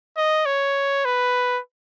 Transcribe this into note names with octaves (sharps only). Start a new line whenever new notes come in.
D#5
C#5
B4